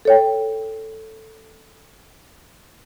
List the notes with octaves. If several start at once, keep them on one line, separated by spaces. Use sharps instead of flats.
A4 C#5 G5